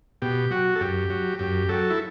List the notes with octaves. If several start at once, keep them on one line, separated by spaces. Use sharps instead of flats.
B2 G4
F#3 F#4
A4
F#2 G4
F#3
F#2 G4
F#3 A4
E4